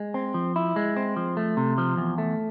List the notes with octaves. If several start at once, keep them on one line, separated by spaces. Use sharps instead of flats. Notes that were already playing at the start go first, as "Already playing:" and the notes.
Already playing: G#3
C4
F3
E4
G#3
C4
F3
A3
C3
F3
E2
A3